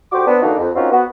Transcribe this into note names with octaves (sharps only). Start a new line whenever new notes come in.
D2 F#4 G4 C5 D6
B3 C4 D4
D3 E3 A#3 D4 D#4 F#4
F2
A#3 C4 C#4 D#4 F4 F#4
B3 F#4